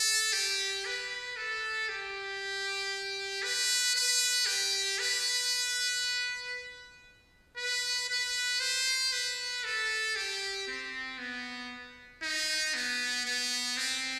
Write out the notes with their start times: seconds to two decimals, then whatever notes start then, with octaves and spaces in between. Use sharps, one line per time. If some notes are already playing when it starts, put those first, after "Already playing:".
Already playing: A4
0.33 G4
0.85 B4
1.37 A4
1.89 G4
3.43 B4
3.96 B4
4.46 G4
4.99 B4
7.57 B4
8.09 B4
8.60 C5
9.12 B4
9.64 A4
10.16 G4
10.68 C4
11.18 B3
12.23 D#4
12.74 B3
13.25 B3
13.77 C4